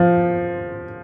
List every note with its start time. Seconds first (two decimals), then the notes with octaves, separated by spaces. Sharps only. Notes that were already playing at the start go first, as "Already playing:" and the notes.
Already playing: F3